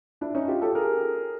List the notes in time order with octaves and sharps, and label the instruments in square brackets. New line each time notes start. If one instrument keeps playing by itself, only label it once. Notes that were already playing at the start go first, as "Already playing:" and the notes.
[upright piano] D4 E4
C#4 D#4
F4 G4
G4 A4
G#4 A#4